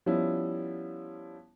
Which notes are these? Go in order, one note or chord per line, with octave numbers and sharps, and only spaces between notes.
F3 G3 B3 C#4 E4